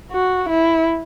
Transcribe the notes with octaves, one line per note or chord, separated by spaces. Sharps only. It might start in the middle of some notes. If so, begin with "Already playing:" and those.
F#4
E4